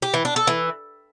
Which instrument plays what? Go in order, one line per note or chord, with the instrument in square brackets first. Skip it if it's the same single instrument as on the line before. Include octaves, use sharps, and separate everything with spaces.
[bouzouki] G4
E3
D4
A4
E3